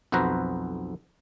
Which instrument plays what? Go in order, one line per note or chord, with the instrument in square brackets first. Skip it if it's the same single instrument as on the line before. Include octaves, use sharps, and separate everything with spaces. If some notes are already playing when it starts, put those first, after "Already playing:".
[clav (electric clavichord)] B1 F2 F#4 B4 C5 A#5